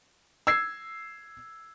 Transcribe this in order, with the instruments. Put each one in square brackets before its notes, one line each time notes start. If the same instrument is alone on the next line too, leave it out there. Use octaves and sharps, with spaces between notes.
[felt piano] E6 G#6 C7